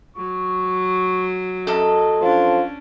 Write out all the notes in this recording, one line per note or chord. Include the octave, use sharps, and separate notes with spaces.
F#3 C#6
F#2 A4 D#5
F3 C#4 D4 C6